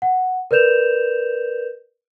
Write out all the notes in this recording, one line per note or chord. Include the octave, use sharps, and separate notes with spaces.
F#5
A#4 B4 D5 G6 E7 F7